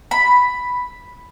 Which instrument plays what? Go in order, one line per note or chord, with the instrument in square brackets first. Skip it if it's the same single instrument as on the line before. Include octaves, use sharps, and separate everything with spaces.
[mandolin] B5